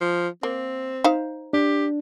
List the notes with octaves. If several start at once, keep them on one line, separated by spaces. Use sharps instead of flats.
F3
A#3 C4
D#4 C5 F5
D4 G4